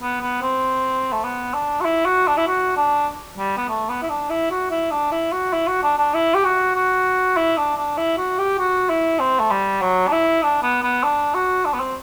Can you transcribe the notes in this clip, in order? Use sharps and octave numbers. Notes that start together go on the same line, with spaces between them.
B3
B3
C4
A3
B3
D4
F#4
E4
F#4
D4
E4
F#4
D4
G3
B3
A3
B3
E4
D4
E4
F#4
E4
D4
E4
F#4
E4
F#4
D4
D4
E4
G4
F#4
F#4
E4
D4
D4
E4
F#4
G4
F#4
E4
C4
A3
G3
F#3
D4
E4
D4
B3
B3
D4
F#4
D4
B3
C4